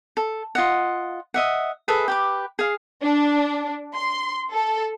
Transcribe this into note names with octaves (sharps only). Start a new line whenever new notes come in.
A4
F4 D#5 F#5
D#5 E5 F#5
G#4 A4 B4 E5
G4 B4 D6
G#4 F5
D4
C6
A4